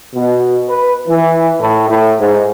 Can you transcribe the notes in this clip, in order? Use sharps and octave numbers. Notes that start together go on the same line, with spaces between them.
B2
B4
E3
A2
A2
G#2